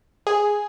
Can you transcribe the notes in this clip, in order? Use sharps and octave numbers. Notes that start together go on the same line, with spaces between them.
G#4